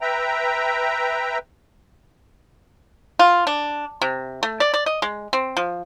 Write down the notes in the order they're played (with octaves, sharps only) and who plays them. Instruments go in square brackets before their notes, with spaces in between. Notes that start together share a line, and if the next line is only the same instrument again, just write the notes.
[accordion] B4 E5 G5 A#5
[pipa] F4
D4
C3
A3
D5
D5
D#5
G#3
C4
F3